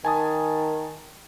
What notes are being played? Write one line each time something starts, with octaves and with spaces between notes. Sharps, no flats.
D#3 G#5 A5 D#6